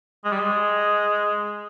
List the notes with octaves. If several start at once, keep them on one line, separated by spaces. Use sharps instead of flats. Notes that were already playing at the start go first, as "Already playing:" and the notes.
G#3
G3
G#3